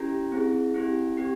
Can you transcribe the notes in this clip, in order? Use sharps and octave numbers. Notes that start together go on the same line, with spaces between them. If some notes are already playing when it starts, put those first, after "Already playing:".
Already playing: C#4 E4 G4 A#5
C4 E4 G#4
C4 E4 G4
C4 G4